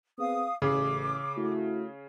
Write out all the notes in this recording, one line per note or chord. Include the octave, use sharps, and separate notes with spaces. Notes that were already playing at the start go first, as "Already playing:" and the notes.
B3 C4 G#4 F5 D#6
A1 C#3 G#4 D6
A3 E4 F#4